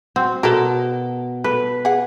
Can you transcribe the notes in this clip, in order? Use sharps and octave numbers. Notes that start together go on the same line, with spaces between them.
C4 F#4
B2 A4 A#4
A4 B4
G#4 F#5